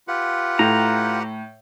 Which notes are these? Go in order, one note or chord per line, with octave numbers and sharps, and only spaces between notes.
F4 G4 B4 F#5
A2 A#5